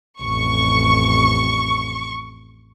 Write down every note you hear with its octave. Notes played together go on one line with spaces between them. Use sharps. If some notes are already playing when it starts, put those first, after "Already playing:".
A1 F2 C#6